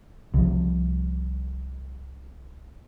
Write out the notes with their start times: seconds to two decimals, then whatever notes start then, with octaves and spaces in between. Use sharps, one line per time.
0.34 C2 F3